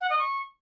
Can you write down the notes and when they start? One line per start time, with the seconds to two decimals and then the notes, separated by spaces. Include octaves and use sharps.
0.01 F#5
0.10 D#5
0.19 C#6